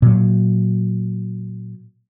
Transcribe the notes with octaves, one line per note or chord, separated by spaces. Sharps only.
A#2 F#3